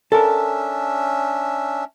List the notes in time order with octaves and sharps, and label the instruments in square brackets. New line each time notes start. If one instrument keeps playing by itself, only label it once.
[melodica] C#4 D4 E5 [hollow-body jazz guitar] A4 A#4